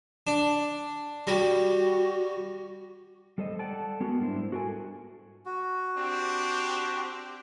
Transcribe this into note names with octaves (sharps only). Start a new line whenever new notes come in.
D4
G3 F#4
G3 A4 C5 D#5
A4 D5 F#5 G5 A5
G#3 B3 F#4 A#4
G#2 G3 D4 E4 C5
F#4 A4 A#4 D#5 G#5
F#4
C4 D4 G4